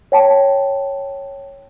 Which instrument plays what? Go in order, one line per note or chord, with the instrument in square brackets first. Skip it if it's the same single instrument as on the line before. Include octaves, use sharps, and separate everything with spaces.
[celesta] C#5 G5 A5